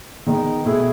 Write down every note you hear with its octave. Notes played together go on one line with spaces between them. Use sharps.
D#3 G#3 B3 D#4
B2 A3 E4 G#4